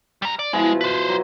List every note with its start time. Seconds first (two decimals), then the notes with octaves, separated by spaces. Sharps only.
0.22 G3 A#5
0.39 D5
0.53 B2 F3 G#3 E4
0.81 B4 C5
1.09 F#3